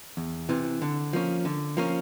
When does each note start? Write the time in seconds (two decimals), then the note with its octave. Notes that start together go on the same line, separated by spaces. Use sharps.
0.17 E2
0.49 C3 E3
0.82 D3
1.13 F3 A#3 C#4
1.45 D3
1.77 F3 A#3 C#4